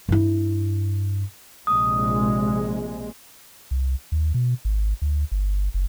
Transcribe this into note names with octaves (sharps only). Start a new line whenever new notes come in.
G2 E4
A#1 C3 G#3 D#6
C2
D#2
B2
G#1
D2
G1
F#1